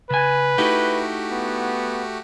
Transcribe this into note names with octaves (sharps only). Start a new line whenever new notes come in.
C#3 B4 G#5
A3 D#4 E4 F#4 G4
B3